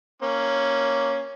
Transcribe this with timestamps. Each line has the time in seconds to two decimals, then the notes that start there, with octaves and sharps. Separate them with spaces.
0.22 A#3 C#4